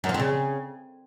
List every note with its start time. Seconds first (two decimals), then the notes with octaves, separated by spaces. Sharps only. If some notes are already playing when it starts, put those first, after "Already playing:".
0.04 F#2
0.09 F3
0.14 F2
0.20 C#3